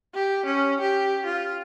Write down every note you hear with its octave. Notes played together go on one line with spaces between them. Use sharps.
G4
C#4
G4
F4